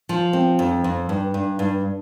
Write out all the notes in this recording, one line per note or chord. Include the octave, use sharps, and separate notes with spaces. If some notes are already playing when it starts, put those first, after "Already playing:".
F3
C4
F2
F2
G2
G2
G2